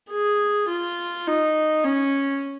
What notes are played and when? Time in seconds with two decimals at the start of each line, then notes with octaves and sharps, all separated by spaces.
0.10 G#4
0.69 F4
1.27 D#4
1.84 C#4